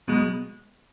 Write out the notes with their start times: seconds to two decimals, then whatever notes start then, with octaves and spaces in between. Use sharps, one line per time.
0.08 B1 B2 G#3